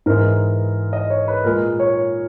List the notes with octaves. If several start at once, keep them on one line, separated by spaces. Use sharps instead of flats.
G#2 E3 G#3 A#4
D#5
C#5
B4
A#2 G#3 A#4
C#5